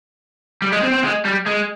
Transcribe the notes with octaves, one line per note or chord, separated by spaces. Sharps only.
G3
G#3
C4
C4
G#3
G3
G#3